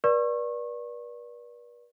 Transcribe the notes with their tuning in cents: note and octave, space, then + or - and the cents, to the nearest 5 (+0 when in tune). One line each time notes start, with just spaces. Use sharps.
B4 -45 D5 +0 C#6 -30